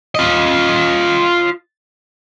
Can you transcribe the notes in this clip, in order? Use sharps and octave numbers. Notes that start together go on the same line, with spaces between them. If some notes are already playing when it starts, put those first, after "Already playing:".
F4 D#5